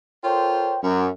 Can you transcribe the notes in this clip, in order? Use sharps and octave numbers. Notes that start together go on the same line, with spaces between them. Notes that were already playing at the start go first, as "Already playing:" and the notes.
F4 A4 A#4 C5 C#5 G5
F#2